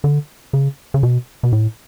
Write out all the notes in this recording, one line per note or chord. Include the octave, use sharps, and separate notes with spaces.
D3
C#3
C#3
B2
B2
A2